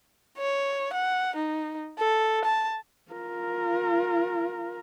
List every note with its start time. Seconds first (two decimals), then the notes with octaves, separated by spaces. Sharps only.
0.38 C#5
0.93 F#5
1.36 D#4
1.98 A4
2.44 A5
3.11 F4 A#4